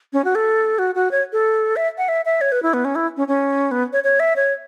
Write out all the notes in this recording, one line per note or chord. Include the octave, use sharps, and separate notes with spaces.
C#4
F#4
A4
F#4
F#4
C#5
A4
E5
F#5
E5
E5
C#5
B4
E4
B3
C#4
E4
C#4
C#4
B3
C#5
C#5
E5
C#5